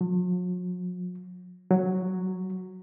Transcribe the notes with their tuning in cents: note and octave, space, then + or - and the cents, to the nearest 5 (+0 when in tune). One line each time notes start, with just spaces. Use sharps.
F#3 -45
F#3 +0